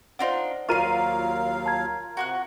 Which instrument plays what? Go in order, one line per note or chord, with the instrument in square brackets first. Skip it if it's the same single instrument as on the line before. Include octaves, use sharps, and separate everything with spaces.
[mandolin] D4 D#4 F4 [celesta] C5 D5 F#5
[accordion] D#2 F#3 F5 [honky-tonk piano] F4 A#4 D#7 [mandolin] C#5 C6
[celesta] A5 A#5 G#6
[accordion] C3 [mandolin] F#4 C#6 F#6